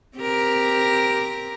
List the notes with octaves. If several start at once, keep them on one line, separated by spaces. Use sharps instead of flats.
C4 G4 A#4